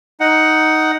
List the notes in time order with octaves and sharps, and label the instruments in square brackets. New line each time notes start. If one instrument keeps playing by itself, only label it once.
[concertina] D#4 F#5